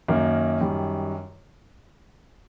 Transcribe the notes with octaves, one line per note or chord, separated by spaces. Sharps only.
F#2 D#3 F#3 A#3
F#2 D#3 G3